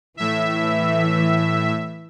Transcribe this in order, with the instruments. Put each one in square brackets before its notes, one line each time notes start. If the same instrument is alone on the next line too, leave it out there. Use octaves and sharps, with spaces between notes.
[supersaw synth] A2 E5 [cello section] E3